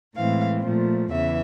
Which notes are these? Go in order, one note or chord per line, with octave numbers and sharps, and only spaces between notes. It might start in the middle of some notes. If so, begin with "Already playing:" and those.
A2 E3 G#3 C4 F5
A#2 F3 A3
E2 C#3 E3 E5